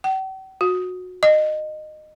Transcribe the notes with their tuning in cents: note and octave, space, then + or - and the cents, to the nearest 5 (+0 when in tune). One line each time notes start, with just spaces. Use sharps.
G5 -45
F#4 -20
D#5 -20